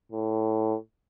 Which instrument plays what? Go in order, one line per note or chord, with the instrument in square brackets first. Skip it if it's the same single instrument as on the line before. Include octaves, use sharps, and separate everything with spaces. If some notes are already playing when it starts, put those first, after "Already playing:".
[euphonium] A2